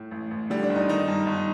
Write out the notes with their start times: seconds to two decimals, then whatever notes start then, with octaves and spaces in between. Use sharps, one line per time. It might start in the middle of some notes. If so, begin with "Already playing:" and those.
Already playing: A2
0.11 A1
0.31 A1
0.50 D3 G3
0.63 D4
0.70 G1
0.75 D#4
0.88 D#3 D#4
1.08 G2
1.27 G1